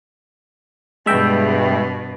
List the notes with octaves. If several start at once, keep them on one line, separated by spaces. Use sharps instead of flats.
G2 B2 G#3 E5 G5